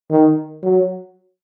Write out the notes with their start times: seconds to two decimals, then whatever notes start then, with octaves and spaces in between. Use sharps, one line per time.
0.11 D#3
0.62 F#3